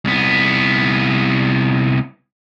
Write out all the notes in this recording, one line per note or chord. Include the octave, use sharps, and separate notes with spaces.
C2 B3